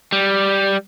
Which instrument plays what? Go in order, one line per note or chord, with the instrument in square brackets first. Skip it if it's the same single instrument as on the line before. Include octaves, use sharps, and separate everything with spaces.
[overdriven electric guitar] G3